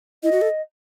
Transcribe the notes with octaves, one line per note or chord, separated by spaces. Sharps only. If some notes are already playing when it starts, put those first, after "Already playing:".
E4 D#5
F#4
A4